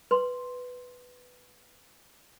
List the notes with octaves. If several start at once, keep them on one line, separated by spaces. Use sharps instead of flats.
B4 C6